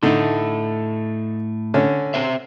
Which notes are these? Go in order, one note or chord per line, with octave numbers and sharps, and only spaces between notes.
A2 D3 A3 D#4
D3 C#4
C4 C5 E5